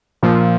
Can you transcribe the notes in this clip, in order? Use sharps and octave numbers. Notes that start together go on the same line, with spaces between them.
A#2 F3